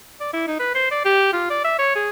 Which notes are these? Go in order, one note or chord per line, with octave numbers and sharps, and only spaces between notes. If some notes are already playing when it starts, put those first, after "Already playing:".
D5
E4
D#4
B4
C5
D5
G4
F4
D5
E5
C#5
G#4